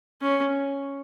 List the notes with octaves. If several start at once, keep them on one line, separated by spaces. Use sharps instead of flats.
C#4